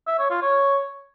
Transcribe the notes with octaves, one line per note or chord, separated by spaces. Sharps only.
E5
C#5
F4
C#5